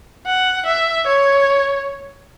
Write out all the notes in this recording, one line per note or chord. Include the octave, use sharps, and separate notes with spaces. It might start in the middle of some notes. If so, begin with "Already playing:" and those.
F#5
E5
C#5